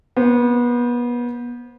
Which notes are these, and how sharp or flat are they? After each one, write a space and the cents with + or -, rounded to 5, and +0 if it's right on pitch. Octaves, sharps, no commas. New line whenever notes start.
B3 -30 C5 +0